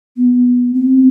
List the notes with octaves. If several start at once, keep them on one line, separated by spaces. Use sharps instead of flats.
B3
C4